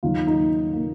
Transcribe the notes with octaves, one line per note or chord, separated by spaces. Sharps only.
D#2 D#3 F#3 F4
D#4
A#3